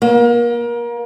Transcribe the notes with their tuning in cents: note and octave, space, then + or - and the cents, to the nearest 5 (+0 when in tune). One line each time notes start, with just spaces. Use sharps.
A#3 +30